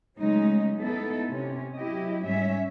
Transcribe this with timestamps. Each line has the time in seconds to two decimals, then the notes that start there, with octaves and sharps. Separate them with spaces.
0.20 C#3 F#3 G#3 A3 C#4 D#4
0.79 B3 D#4 E4 A4
1.29 C3 C#4
1.76 F#3 E4 G4 D#5
2.23 G#2 G3 C#4 E5